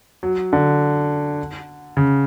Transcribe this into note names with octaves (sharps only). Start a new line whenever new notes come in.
F#3
D3
C#3